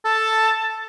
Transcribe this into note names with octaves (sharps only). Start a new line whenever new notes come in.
A4 A5